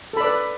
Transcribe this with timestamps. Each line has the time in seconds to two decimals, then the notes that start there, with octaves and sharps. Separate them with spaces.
0.13 A4
0.17 B5
0.20 D5
0.24 B4